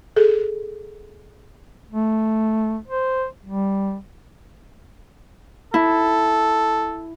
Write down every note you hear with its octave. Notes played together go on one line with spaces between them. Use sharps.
G#4 A4
A3
C5
G3
E4 A4